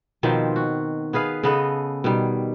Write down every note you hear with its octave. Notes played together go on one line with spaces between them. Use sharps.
B2 D#3 F3 C4
F#4
B3 G#4 B4 F5
C#3 B3 A4 D#5
B2 D#3 G3